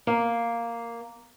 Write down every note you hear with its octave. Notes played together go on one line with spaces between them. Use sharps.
A#3